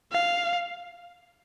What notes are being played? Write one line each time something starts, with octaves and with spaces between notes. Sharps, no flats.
F5